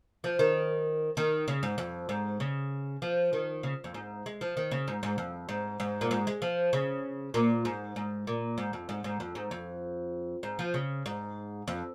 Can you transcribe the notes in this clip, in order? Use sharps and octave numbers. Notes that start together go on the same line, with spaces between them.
F3
D#3
D#3
C#3
G#2
F2
G#2
C#3
F3
D#3
C#3
F2
G#2
G#3
F3
D#3
C#3
G#2
G#2
F2
G#2
G#2
A#2
G#2
G#3
F3
C#3
A#2
G#2
G#2
A#2
G#2
F2
G#2
G#2
F2
G#2
F2
G#2
F3
C#3
G#2
F2